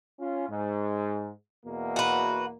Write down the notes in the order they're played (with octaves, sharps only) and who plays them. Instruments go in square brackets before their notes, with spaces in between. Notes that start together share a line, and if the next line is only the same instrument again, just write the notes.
[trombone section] C#4 F4
G#2
E2 B2 A#3
[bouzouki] F#4 B4